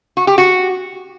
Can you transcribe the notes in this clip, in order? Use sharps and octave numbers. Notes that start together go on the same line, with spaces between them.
F#4
G4
F#4